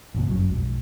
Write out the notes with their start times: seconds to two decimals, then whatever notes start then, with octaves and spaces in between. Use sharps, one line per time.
0.14 A1 F#2 C#3 A#3
0.27 G1 F#2 B2 F#3
0.50 B1 F2 G#3